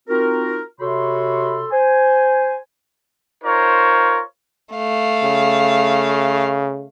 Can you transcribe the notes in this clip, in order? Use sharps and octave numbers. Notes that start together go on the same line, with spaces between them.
C4 D#4 F4 F#4 A#4
C3 F#4 A4 C#5 B5 C6
C5 G#5
D#4 F4 A#4 C5 C#5
A3 F5
C#3